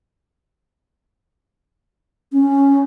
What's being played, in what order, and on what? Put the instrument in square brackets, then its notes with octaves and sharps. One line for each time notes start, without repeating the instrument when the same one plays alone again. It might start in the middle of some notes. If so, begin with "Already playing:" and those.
[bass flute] C#4